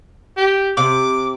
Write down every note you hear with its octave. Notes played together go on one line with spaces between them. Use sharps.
G4
C3 D6